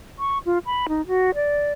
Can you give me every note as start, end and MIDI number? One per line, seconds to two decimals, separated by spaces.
0.19 0.38 85
0.46 0.58 65
0.66 0.86 83
0.89 1.05 63
1.07 1.34 66
1.35 1.73 74